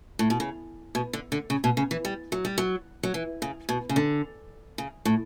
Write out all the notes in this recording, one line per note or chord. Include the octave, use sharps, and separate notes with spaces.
A2
B2
C#3
B2
D3
D3
C#3
B2
C#3
E3
G3
F#3
G3
F#3
F#3
E3
C#3
B2
C#3
D3
C#3
A2